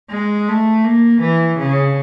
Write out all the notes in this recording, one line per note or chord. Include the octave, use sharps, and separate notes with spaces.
G#3
A3
A#3
E3
C#3